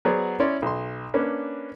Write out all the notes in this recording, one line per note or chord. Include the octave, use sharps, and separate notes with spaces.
F#3 B3 G#4 C5 D5
C#4 E4 C#5 D5 C6
B1 C6
A#3 C#4 D4 B4